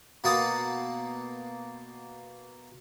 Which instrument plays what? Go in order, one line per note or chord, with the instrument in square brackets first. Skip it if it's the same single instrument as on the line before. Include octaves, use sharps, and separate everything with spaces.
[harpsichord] B2 A#3 F#5 A5 D#6